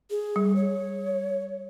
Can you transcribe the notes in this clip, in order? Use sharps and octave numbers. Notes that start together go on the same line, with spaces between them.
G#4
G3
C#5